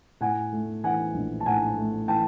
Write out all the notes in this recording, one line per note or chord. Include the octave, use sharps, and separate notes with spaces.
A2 F#5 G#5
A3
E3 F#5 G#5
A#1
A5
A2 F#5 G#5
A3
E3 G5 A5